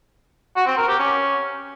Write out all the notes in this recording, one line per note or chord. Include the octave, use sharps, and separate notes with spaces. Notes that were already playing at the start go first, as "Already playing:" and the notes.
F#4
C4
A#4
G4
C#4